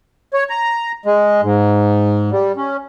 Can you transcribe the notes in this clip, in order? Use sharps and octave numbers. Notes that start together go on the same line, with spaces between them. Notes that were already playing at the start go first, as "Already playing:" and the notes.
C#5
A#5
G#3
G#2
G3
C#4